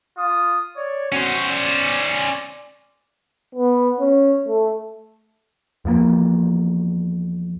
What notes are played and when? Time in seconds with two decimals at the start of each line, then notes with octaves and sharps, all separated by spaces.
0.17 F4 D#6
0.76 C#5 D5
1.12 C#4 F#4 C5
1.49 D5
3.55 B3
4.00 C#4
4.48 A3
5.85 E2 F3 A#3